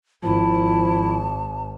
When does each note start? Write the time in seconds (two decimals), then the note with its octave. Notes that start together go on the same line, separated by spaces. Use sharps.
0.23 G#1 F3 E4 A5